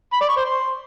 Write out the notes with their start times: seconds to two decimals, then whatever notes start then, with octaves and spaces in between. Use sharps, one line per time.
0.13 B5
0.21 D5
0.29 C#6
0.37 C5
0.45 C6